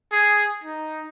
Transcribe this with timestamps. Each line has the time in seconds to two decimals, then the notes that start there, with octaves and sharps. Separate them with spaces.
0.12 G#4
0.64 D#4